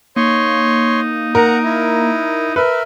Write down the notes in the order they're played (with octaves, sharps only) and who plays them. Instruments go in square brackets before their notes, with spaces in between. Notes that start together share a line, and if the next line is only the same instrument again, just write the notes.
[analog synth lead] A#3 [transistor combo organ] D#4 [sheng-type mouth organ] C#5 C6 C#6
[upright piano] A#4 [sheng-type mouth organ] F#5 A#5
[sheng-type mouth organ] E4
[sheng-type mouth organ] A#4 E5 [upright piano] B4